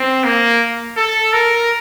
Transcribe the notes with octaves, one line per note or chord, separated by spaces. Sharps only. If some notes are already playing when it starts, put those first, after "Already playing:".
Already playing: C4
A#3
A4
A#4